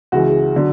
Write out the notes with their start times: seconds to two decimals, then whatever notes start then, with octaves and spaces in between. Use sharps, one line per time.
0.12 C#2 C#3 E3 F#4
0.56 D3 F#3